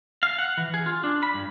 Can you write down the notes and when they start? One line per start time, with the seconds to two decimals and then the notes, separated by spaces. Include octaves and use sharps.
0.23 F5
0.38 F#5
0.57 E3
0.74 G#4
0.86 F4
1.04 D4
1.23 B5
1.34 G2